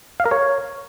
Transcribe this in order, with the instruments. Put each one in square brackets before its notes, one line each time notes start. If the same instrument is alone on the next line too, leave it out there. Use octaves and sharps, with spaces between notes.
[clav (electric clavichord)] F5
A#4
C#5